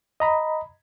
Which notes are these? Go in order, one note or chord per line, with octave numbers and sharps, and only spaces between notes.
D#5 A#5 B5